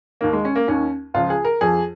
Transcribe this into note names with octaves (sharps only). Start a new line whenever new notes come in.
D#2 D#3 A#3
G#3
C#4
A#3
D#2 D#3 C#4
C#2 C#3 F3 F4
G#4
A#4
F2 F3 G#4